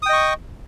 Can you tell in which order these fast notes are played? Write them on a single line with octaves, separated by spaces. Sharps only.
D#6 G5 D#5 C#6